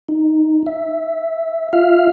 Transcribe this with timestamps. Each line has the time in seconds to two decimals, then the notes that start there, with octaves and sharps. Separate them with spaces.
0.09 D#4
0.66 E5
1.73 F4 E5 F5 F6